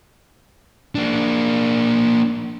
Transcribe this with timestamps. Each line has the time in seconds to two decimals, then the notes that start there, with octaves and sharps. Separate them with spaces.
0.95 A#3 D4